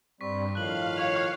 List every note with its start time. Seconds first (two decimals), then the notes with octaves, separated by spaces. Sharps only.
0.21 G2 G3 C4 C#6 B6
0.55 A2 D#3 F3 F5 F#6 F#7
0.97 C#5 F7